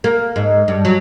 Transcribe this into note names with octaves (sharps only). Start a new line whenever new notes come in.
A#3
G#2
G2
F#3